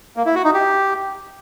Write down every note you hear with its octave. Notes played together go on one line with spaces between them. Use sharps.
A#3
E4
F#4
D#4
G4